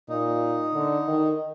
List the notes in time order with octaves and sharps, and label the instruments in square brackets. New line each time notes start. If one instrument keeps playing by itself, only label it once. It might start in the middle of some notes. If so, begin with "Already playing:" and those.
[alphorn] A#2 [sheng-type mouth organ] D#4
[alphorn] D3
D#3